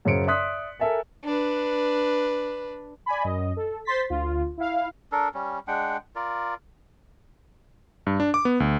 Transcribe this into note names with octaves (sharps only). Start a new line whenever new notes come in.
F#2 C#3 C#4 C5 C#7 D7
D5 E5 C6 D#6 F#6 B6
A4 A#4 E5 G#5 A5
D4 B4
D5 G#5 B5
F#2 D#5
A4
C5 C6 A6 B6
D2 F4
E4 F5
D4 A4 A#4
G3 C#4
G#3 D4 F#5 G5
F4 A#4 D5
G2
D4
D6
B3
D2